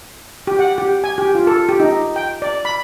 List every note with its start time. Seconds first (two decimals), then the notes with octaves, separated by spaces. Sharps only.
0.47 G4
0.59 F#5
0.78 G4
1.04 G#5
1.18 G4
1.35 F4
1.47 A4
1.69 G4
1.80 D#4
2.16 G5
2.42 D5
2.65 B5